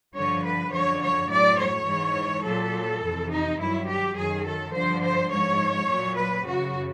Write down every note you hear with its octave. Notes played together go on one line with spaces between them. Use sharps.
G2 D3 F3 C#5
B4
F#2 D3 F3 C#5
C#5
A2 F#3 D5
C#5
G#2 E3
A#2 F#3 A4
F2 C3 E3
D#4
G2 D#3 F#3 E4
G4
F#2 D#3 F#3 G#4
A4
G2 D3 F3 C5
C5
G#2 F3 C#5
A#2 F#3
B4
F#2 C#3 E3 F#4